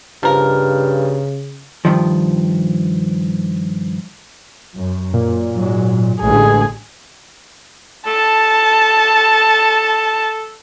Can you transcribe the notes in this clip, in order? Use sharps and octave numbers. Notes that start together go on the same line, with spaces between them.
G2 C#3 F3 A#4
G2 D#3 F3
F#2
A#2
G#2 F#3
A1 D3 G#3 G#4
A4 A5